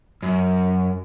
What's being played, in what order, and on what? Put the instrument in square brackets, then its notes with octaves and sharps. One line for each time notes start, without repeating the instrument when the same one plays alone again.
[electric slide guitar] F#2